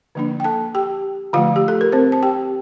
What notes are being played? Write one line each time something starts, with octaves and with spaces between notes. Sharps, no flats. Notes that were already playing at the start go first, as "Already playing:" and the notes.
D3 F3 A#3 D4
G5
A4 A5
G4 G5
D3 F3 A3 F4 F5
G4
A4
A#4
C4 C5
A5
G4 G5